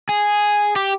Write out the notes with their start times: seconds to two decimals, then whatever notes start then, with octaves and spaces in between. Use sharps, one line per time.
0.09 G#4
0.76 G4